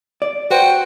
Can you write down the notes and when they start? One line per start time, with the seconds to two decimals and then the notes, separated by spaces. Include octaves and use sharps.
0.22 D5
0.51 F#4 B4 C5 G5 C6